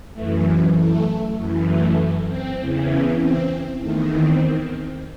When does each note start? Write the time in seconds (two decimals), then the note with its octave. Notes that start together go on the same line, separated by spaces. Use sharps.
0.13 F#2 E3 A3
0.75 A3
1.36 F#2 E3
1.67 A3
2.28 C4
2.58 E2 C#3 E3
2.90 C#4
3.20 C4
3.80 E2 D#3 A3
4.11 C4